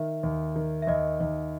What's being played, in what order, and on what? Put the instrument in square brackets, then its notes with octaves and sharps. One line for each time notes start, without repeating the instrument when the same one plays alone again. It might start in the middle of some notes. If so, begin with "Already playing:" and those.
Already playing: [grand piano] D#3 [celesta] E5
[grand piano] D#2
D#3
[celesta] E5
[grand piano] D#2 [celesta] D#5
[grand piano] D#2